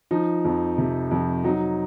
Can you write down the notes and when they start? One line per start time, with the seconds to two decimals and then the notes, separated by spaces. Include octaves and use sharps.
0.11 F3 D#4
0.45 F2
0.78 C3
1.11 F2
1.44 F#3 D#4